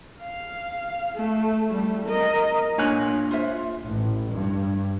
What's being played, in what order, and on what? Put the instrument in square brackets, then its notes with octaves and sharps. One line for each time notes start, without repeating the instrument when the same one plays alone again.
[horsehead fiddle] F5
A3
G3 A3
A#4 D#5
[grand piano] A#2 C#5 F#6 [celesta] D4 [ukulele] G#5
[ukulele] F4 C5 E5
[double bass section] A1
G2